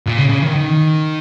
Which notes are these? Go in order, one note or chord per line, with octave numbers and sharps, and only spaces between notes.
A#2
C#3
C#3
D#3
D#3